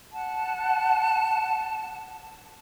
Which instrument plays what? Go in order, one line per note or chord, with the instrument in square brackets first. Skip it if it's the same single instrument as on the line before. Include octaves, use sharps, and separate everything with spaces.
[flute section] F#5 A5